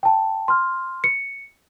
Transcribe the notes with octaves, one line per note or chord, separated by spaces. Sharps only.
G5 A5
C6 F6
C#7